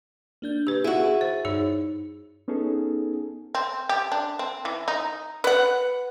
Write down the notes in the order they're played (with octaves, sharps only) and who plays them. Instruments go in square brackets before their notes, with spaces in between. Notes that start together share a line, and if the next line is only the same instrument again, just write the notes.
[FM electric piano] A#3 D4 G6
[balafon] G4 B4
[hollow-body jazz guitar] E4 F#4 [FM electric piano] G#4
[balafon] C5
[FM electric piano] G2 [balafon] D#4 G#4 C#5
[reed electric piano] B3 C#4 D#4 G#4 A4
[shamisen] C4
G4
D4
C4
E3
D#4
[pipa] B4 F#5